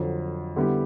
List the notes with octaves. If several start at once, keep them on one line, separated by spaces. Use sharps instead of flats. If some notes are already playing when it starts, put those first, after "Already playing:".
Already playing: F2 D3 F#3
D3 G3 B3 E4 G4